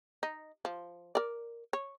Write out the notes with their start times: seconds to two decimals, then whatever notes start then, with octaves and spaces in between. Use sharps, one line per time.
0.23 D#4
0.65 F3
1.15 A#4 D5
1.73 C#5